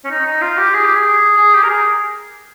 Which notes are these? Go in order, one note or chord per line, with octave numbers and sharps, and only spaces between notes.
C#4
D#4
D#4
F4
G4
G#4
G4
G#4
G#4
G4
A#4
G#4